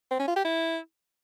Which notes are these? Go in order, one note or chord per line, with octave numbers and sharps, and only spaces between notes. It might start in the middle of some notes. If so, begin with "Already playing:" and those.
C4
C#4
F4
G4
E4